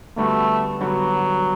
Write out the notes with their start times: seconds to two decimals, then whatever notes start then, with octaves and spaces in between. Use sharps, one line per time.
0.18 D3 G3 A3 B3 F#4
0.80 D3 F#3 G3 B3 F#4